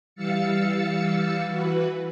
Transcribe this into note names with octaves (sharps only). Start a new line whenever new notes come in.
E3 G3 F5 E6 A6 C#7
E3 F#4 B4